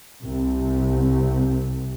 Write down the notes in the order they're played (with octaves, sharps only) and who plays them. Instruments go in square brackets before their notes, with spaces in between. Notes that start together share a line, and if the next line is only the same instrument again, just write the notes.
[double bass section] C2 C3